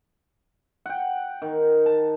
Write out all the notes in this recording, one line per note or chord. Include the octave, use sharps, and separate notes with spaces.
F#5 G5
D#3
A5